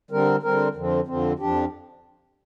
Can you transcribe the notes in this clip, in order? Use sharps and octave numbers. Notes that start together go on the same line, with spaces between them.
D3 G3 C4 A#4
D3 G3 C4 A#4
F2 D3 F3 C4
F2 D3 F3 C4
F2 F3 D4 G4